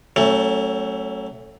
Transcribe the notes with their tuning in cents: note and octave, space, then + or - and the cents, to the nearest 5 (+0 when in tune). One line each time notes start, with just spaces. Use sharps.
F#3 +25 A3 +10 C#4 -25